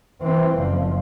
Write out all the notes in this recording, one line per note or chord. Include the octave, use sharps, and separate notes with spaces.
E3 C4
F#1 F3